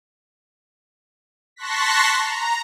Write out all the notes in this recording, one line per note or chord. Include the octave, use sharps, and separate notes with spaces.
A5 C6 C#6 F#6 A#6 B6
A#5